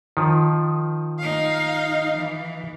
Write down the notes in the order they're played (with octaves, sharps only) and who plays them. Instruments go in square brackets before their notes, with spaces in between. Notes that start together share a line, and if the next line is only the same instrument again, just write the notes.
[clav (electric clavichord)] D#3 F3
[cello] D#4 F5
E3